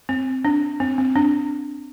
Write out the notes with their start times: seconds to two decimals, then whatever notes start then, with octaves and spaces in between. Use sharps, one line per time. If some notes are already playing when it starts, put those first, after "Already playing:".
0.09 C4
0.45 D4
0.80 C4
0.98 C4
1.16 D4